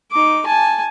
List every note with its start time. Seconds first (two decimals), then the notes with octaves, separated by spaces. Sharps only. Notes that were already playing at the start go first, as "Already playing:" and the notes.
0.12 D#4 D6
0.46 G#5 A5